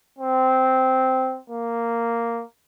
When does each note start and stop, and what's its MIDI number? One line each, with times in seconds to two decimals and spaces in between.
0.19 1.39 60
1.50 2.43 58